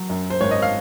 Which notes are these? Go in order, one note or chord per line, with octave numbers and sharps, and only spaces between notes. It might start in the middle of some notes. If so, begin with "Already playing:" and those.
Already playing: F#3
F#2
C5
G#1 C#5
D#5
F5